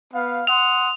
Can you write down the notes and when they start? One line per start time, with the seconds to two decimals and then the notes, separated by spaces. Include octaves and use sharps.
0.14 B3 F5
0.47 F#5 C6 D#6 F7